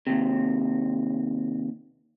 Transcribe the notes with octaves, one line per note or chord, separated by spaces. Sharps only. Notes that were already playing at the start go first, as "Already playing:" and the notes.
D#2 C3